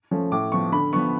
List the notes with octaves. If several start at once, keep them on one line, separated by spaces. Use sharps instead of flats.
F3 A3 C#4
A2 D6
F3 B3 C#6
D3 B5
F3 B3 C#6